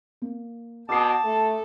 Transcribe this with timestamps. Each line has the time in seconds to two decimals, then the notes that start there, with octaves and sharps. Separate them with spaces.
0.22 A#3
0.89 B2 A5 D6 D#6 C7
1.24 A3 A4